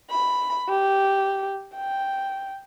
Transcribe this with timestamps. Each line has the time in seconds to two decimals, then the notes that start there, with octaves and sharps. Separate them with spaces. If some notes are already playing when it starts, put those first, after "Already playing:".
0.11 B5
0.69 G4
1.76 G5